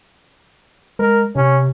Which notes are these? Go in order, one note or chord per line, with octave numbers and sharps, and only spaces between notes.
G#3 A#4
C3 C#4